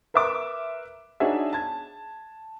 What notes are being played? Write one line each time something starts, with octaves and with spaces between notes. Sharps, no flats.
A#4 B4 E5 C6 D6
D4 D#4 F#4 G#4 C#5 E5
A5 G#6